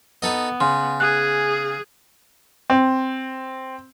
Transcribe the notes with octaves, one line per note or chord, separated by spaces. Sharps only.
B3 D#4 A4 D#5
C#3 C6
G#4 F#6
C4